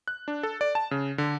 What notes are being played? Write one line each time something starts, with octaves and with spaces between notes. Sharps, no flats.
F#6
D4
A4
D5
A5
C#3
D3